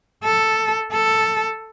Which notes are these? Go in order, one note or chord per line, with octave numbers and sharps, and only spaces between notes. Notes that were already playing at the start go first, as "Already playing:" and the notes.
A4
A4